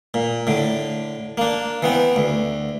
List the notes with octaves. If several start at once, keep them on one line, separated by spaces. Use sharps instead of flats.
A#2
A2 D3
A#3 D4
E3 B3 C4
D2